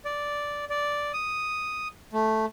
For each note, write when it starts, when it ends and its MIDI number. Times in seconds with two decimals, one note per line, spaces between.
0.05 0.65 74
0.70 1.12 74
1.13 1.88 87
2.13 2.46 57